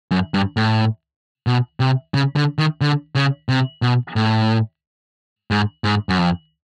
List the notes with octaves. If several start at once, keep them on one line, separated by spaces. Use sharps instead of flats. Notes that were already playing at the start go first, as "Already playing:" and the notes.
F#2
G2
A2
B2
C3
C#3
D3
D#3
D3
C#3
C3
B2
A2
G#2
G#2
F#2
F2